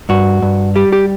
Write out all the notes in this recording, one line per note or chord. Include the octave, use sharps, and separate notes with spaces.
G2 F#4
G2
G3 G4
G4